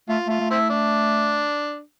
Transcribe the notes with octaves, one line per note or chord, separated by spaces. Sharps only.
A3 F4
A3 F4
A3
C4 E4
D4